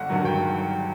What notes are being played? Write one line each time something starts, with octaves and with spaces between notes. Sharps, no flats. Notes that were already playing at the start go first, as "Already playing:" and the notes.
Already playing: G1 F#5
G2 D#3 F#3
G5